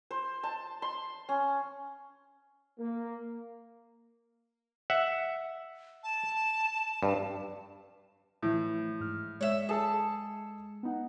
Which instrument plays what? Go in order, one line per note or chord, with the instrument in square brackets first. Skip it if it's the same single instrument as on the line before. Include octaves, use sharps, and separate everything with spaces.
[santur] C5
A5
C6
C#4
[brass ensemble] A#3
[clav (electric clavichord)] E5 F#5
[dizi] A5
[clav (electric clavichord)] G2
[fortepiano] A2 [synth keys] E3 F3 A3
[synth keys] G#2 F6
[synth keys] G#3 [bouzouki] C#5 E5
[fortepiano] G#4 A4 [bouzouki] A5
[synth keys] B3 D#4 F#5